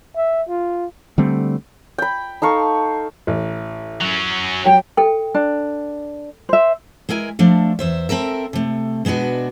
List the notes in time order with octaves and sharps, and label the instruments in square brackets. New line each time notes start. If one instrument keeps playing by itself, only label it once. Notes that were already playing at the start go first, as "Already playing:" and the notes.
[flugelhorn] E5
F4
[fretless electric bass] D3 G3 A3 C4
[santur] G5 B5
D#4 A4 F5 C#6
[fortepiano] A1
[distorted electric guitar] F#3 C#4
[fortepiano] F#3 [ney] G5
[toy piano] A4 G5
[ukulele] D4
C5 E5
[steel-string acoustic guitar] G#3 E4 A#4 G#5
F3 A3 D4
E2 C5 E5
C4 A4 A#4 E5
C3 A3
B2 G#3 B3 D4 F#4